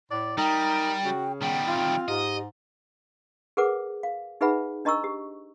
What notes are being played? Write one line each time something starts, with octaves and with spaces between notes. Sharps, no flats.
A2 D5
G3 D#4 A#4 G5
C#3 F#4
D#3 G3 B3 G5
C4 F4
G#2 G4 D#5
G#4 A#4 B4 F#5 D6
F5
D#4 G#4 B4 E5 F#5 B5
D4 D#5 A#5 C#6 E6
G4